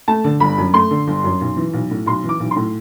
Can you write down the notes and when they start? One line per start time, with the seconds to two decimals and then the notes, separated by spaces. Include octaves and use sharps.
0.08 A3 A5
0.24 D3
0.40 G1 B5
0.58 F#2
0.74 A3 C6
0.91 D3
1.07 G1
1.24 F#2
1.41 B1
1.57 E3
1.73 B1
1.91 A2
2.06 B1 C6
2.24 E3
2.29 D6
2.40 B1
2.51 C6
2.56 A2